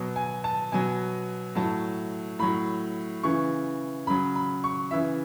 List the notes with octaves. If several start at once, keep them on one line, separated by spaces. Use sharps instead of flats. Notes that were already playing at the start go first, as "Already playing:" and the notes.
Already playing: B2 F#3
G#5
A5
B2 F#3 G#5
A2 F#3 A5
A2 F#3 B5
C#3 E3 C#6
C#3 F#3 B5
B5
C#6
C#3 E3 E5